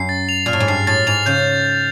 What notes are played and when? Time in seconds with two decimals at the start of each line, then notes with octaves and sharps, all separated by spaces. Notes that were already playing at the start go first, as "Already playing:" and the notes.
Already playing: F#2 C7
0.09 A6
0.29 F7
0.46 A#2 F6
0.53 A2
0.60 G#2
0.68 G2 C7
0.87 A2 A6
1.07 G#2 F7
1.26 C#3 G6